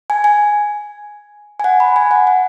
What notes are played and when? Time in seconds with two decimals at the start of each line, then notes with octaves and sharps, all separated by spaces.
0.10 G#5
0.24 G#5
1.60 G#5
1.64 F#5
1.80 B5
1.96 G#5
2.11 F#5
2.27 F#5